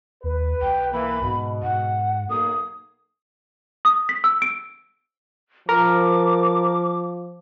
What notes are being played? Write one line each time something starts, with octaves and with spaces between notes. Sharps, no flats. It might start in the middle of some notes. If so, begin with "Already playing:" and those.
D#2 B4
B1 G5
E3 A#3 B5
G#2 B2
G#2 F#5
B1 A#3 D#6
D#6
B6
E6
D7
F3 A#4 D6